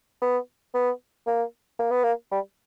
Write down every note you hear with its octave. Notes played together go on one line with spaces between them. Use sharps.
B3
B3
A#3
A#3
B3
A#3
G3